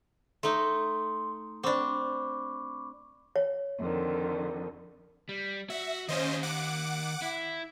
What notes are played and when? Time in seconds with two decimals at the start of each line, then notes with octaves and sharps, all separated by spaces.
0.43 A3 D#4 C6
1.63 C4 D4 B5 C#6 D6
3.36 C#5
3.79 F2 D3 D#3
5.29 G3
5.70 F#4 E5
6.08 D#3 C#4 C5 D#5 F5
6.43 F#5 D6
7.22 E4